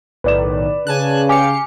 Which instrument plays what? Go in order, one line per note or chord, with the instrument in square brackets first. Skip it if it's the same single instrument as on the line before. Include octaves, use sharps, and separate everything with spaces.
[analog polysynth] B1 A2 D#3 [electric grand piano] B4 D5 E7
[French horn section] C#3 [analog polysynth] G#5 A5 F#6
[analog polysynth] G4 F5 C#7 [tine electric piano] G#5 D6